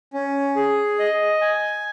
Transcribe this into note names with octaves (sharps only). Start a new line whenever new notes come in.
C#4
G#4
D#5
G#5